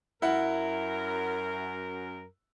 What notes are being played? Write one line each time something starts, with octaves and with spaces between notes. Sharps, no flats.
F#2 E4 A#4 F#5